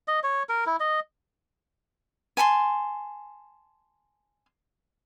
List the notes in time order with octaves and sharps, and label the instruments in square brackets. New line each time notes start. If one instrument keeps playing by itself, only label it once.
[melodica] D#5
C#5
A#4
E4
D#5
[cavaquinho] G#5 A5 B5 C6